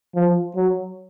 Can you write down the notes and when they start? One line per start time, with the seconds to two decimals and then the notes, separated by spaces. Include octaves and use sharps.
0.15 F3
0.56 F#3